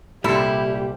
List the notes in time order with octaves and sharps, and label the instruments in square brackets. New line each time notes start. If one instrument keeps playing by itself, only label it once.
[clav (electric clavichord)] C2 A4 [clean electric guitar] A#2 G3 [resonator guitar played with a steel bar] E4 [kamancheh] G4